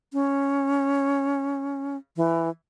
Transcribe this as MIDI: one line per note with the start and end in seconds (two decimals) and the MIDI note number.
0.13 1.97 61
2.17 2.49 52